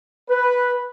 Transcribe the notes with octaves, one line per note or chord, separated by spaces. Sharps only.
B4